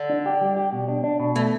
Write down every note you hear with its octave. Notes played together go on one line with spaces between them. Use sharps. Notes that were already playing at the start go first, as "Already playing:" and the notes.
Already playing: D3
D4
G4
G3
G4
B2
D4
D4
B2
E3 A3